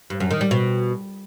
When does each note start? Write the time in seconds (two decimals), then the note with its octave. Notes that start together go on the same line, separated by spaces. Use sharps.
0.10 G2
0.20 F#2
0.31 D#3
0.41 G3
0.51 B2